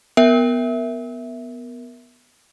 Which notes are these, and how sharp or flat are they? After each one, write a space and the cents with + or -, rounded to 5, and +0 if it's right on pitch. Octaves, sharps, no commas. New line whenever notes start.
B3 +0 A#4 +0 E5 +0